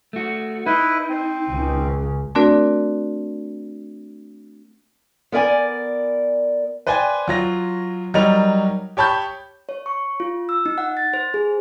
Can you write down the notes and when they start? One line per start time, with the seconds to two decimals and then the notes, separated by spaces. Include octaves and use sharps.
0.13 A3 F#4
0.66 D#4 E4 B4
1.09 C4
1.50 C#2 C#3
2.35 A3 C4 D4 F#4 A#4 D5
5.32 B3 A#4 D5 G#5
6.87 B4 C5 D5 G5 G#5
7.28 F#3 F4 A#6
8.14 F#3 G3 D#4 A#4 A#5 F7
8.97 G4 C#5 A5 B5 G6
9.69 C#5
9.86 C#6
10.20 F4
10.49 E6
10.66 D#4
10.78 F#5
10.97 A6
11.14 C5
11.34 G#4